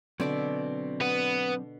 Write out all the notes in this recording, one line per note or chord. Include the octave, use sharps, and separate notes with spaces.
B2 D3 F#3 C4 D5 E5
B3